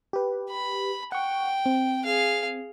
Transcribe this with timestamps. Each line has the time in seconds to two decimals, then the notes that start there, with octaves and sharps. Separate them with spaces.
0.13 G4 B4
0.49 B5
1.12 F#5 G5 C#6
1.66 C4
2.04 G#4 F5